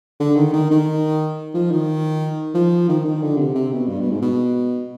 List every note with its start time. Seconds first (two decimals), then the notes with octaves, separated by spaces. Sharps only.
0.20 D3
0.36 D#3
0.53 D#3
0.71 D#3
1.54 F3
1.71 D#3
2.54 F3
2.89 D#3
3.05 D#3
3.22 D3
3.38 C3
3.55 C3
3.72 B2
3.88 G2
4.00 B2
4.11 G#2
4.22 B2